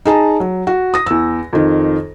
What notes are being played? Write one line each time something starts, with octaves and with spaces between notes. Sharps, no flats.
D#4 G#4 A5 A#5
F#3
F#4
D#6 A#6
E2 E6
F2 D#3